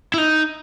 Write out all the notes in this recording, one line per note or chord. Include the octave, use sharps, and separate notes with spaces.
E4
D#4